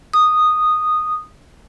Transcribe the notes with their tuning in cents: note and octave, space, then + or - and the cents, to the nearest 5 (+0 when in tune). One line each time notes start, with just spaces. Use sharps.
D#6 -10